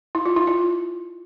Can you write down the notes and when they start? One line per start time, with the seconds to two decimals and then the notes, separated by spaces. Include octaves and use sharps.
0.15 E4
0.26 F4
0.36 E4
0.47 F4